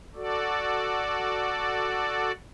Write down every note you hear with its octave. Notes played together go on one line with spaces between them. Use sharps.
F#4 A4 D5